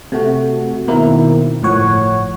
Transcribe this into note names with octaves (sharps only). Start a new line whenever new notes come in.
C3 A3 F#4
B2 D#3 A#3 C4 E4
G1 A2 F3 C#5 F#5